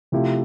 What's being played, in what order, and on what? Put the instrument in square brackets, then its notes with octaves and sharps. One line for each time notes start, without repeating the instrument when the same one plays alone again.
[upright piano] C3 F3 A3 E4 G4